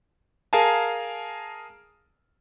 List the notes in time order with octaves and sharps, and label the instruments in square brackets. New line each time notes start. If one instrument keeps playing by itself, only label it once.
[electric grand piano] G#4 A#4 F5 G#5 A5